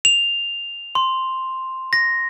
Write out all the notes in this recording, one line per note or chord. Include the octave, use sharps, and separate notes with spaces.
F7
C6
A#6